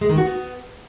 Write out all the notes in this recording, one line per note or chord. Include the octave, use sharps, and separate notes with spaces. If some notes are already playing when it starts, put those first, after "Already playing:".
G#3
D#3
F#4
B3